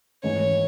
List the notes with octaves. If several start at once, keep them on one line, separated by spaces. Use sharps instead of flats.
G#1 G#2 E3 G#3 C#5